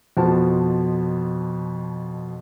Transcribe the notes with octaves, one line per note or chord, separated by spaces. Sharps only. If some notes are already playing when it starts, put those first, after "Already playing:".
F2 B2 F3 A5